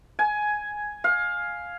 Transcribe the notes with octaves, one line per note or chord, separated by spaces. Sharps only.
G#5
F5